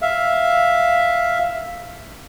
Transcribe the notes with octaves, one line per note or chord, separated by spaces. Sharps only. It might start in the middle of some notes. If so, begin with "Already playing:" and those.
E5 F5